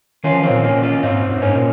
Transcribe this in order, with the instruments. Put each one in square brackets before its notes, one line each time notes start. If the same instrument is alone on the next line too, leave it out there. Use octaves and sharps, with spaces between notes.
[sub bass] D#3 [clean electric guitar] C#4 F4
[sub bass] F3
D#3
[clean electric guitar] C4 D#4
[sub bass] A#2
[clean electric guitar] A#3 C#4
C#4 F4
[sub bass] G#2 [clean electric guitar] C4 D#4
[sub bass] G#2
G2
[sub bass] G#2 [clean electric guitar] A#3 C#4
[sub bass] A#2